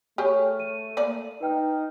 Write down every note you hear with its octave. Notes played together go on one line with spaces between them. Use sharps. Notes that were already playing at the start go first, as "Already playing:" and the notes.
A3 G4 G#4 C#5 C#6 F6
D#7
A#3 D5
D#4 B4 G5 F6